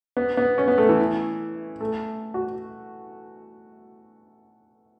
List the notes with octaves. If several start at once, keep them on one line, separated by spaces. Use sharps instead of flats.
B3
B3
C#4
B3
A3
E3
A3
F#4